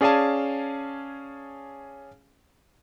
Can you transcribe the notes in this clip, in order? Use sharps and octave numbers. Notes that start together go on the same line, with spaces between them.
C#4 G#4 D5 F5 G#5 A5